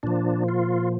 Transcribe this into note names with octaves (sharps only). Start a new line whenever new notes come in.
A#2 F3 D4
F4